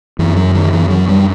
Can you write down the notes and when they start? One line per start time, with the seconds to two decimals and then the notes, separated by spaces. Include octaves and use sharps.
0.19 F#2 E3
0.36 F#3
0.55 D#3
0.73 E3
0.90 F#3
1.08 G3